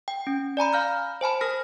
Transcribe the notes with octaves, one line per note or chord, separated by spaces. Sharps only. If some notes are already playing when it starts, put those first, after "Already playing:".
G5
C#4
D5 G#5 A#5 B5
F5 F6 G6
C5 G#5 A5 B5
A#4 F6 A#6